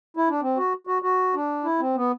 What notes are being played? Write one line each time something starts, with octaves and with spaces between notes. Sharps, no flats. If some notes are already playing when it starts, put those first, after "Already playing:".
E4
D4
C4
F#4
F#4
F#4
D4
E4
C4
B3